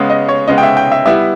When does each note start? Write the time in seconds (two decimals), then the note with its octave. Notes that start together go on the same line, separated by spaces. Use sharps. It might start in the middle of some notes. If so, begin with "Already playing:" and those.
Already playing: C#3 G#3 B3
0.10 D#5
0.29 C#5
0.48 C#3 G#3 B3 D#5
0.58 G5
0.63 E5
0.77 G5
0.92 E5
1.05 G3 B3 E4 E5